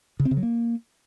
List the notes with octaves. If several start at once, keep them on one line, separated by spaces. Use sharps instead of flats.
C#3
C4
C#3
F#3
A#3